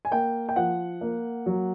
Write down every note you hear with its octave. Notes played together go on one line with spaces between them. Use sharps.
G#5
A#3 G5
G5
F3 F#5
A#3
F#3